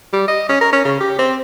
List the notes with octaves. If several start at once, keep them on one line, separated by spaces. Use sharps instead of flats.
G3
D#5
C#4
A#4
C#4
C#3
G4
C4